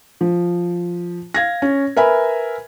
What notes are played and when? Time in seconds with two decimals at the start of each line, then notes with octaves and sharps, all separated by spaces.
0.21 F3
1.34 F5 G#6 A#6
1.62 C#4
1.96 A#4 B4 E5 G#5 B5